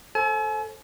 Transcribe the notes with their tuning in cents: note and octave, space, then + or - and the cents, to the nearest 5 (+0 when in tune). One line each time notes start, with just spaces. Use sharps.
A4 +0 C5 +20 G#5 +45